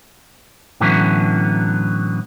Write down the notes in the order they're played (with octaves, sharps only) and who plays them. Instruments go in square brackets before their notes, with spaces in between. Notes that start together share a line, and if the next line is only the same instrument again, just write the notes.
[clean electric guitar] A2 D3 E3 F#3 B3 C#4